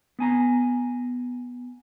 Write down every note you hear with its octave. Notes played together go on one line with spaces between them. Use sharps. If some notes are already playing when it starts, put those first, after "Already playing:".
B3 G#5 A#5